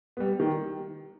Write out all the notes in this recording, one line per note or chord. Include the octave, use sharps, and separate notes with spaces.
G3 B3
D#3